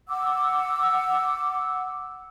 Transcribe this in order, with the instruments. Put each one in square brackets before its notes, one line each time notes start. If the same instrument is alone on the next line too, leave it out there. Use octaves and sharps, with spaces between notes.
[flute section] F#5 D6 E6